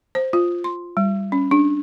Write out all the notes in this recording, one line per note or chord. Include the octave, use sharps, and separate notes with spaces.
C5
F4
C6
G3
C#4
D4